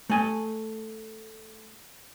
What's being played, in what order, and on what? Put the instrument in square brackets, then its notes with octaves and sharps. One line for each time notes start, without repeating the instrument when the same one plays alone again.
[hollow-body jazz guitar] A3 G#5